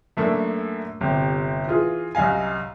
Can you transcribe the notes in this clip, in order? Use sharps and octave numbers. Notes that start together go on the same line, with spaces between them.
F#2 A3 A#3 D4
G1 C3 G4
E3 F4 G#4
C2 F#2 D#5 F5 G#5